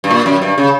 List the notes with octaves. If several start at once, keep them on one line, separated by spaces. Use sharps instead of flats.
G2
A#2
F#2
G2
C#3